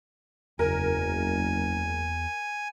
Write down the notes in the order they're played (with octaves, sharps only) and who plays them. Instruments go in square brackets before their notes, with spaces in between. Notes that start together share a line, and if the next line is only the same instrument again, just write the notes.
[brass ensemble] F#1 [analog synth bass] E2 [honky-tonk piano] A#4 [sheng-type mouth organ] G#5